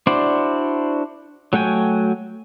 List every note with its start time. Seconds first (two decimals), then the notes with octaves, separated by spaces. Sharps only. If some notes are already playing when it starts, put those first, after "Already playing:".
0.07 D4 E4 F#4 C5 D5
1.53 F#3 A3 F#4 G5 G#5